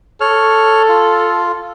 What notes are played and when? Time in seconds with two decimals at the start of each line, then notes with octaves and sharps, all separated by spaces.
0.21 A4 C#5 F6
0.89 F4